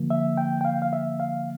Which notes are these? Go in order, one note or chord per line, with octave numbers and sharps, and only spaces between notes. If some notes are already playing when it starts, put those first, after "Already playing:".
Already playing: D3 F3 A#3
E5
G5
G5
F5
F5
E5
F5